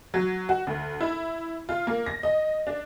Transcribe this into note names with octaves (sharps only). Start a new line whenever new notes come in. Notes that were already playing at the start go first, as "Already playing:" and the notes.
F#3
F#4
D2
E4
F4
A#3
A#6
D#5
D4